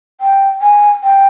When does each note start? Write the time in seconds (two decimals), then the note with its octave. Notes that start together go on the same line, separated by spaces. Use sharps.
0.21 G5
0.62 G#5
1.04 G5